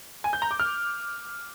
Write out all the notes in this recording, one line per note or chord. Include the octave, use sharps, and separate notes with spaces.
G#5
G6
A#5
D6
F6